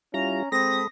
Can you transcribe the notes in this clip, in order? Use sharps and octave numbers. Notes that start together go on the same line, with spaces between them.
G3 C#4 E4 F4 A#5
G#3 C4 A4 B5 D#6 A#6